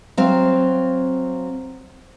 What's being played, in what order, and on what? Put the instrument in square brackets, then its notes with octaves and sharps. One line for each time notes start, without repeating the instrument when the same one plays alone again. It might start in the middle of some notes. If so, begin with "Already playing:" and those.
[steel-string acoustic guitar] F#3 C4 F5